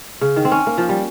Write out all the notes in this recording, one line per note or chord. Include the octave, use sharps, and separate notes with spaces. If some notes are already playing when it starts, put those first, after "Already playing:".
C#3
D#3
C4
C#4
A#3
F3
G3